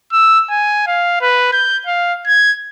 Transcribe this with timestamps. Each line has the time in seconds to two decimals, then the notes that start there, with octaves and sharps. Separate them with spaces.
0.12 E6
0.50 G#5
0.87 F5
1.21 B4
1.53 G6
1.87 F5
2.27 G#6